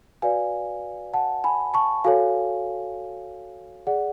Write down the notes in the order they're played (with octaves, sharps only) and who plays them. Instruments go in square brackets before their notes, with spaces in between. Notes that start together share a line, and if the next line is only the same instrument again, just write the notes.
[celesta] F#4 B4 D5 F5 G#5
F#5 A5
G#5 B5
A5 C#6
F#4 A4 C#5 F5 G#5
G#4 D5 F#5